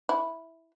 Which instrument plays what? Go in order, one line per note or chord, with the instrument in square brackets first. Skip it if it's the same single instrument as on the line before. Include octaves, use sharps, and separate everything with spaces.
[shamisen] E4